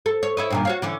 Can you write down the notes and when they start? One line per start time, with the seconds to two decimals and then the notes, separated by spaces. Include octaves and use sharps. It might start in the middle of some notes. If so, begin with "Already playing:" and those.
0.06 A4
0.23 C#5
0.37 E4 C#5 D#5
0.50 G2 A#2 D#3
0.65 F#4 C#5 F5
0.82 D3 E3 C#4